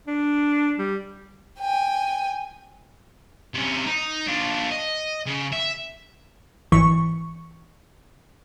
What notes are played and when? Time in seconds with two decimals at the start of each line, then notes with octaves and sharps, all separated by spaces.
0.07 D4
0.79 G3
1.59 G5 G#5
3.54 C3 C#4
3.86 D#4
4.27 D4 F4
4.72 D#5
5.26 C#3
5.52 E5
6.72 G#1 E3 C#6